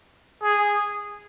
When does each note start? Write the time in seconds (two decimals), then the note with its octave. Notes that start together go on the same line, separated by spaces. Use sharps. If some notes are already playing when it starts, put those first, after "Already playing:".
0.43 G#4